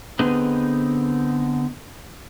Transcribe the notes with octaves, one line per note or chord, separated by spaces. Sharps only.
D3 B3 C4 D#4 G#4 B4